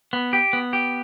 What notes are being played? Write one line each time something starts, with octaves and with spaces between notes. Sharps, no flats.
B3
G4
B3
G4